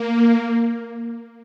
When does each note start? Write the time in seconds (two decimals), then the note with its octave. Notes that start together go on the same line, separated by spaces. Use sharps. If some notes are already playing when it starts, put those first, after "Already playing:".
Already playing: A#3